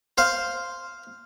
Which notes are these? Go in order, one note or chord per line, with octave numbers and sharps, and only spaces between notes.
C5 F5